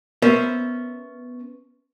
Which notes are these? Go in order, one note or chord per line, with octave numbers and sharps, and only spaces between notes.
B3 C#4 A#4 C5 E5